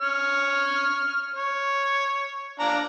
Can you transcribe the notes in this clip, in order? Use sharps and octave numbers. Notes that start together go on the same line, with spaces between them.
C#5 F6
C#5
D4 F5 A#5